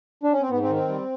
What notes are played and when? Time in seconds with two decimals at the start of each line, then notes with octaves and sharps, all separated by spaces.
0.24 D4
0.33 C#4
0.41 C4
0.50 G#2 B3
0.62 C4
0.69 D#3
0.76 C4
0.88 G3